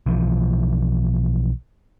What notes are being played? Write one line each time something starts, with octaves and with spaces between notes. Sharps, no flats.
B1 E3 F3